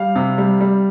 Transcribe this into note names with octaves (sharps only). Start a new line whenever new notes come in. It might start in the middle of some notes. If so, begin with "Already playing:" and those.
Already playing: G3 F5
C3
G3
G3